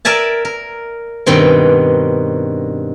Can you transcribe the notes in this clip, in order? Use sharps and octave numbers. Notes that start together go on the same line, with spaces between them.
A#4 D5 E5 G#5 A5
A#4
G2 B2 D#3 C4